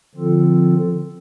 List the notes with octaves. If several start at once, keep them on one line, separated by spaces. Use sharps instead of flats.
D3 F3 C4 F4 A4